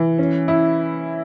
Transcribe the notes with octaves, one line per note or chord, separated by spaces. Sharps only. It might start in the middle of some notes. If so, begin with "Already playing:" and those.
Already playing: E3
C#4
E4